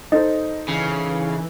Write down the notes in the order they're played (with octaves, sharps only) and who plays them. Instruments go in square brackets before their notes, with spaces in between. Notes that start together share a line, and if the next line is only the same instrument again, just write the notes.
[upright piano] D#4 A4 C5 [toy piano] D#5
[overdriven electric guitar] C#3 [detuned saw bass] E3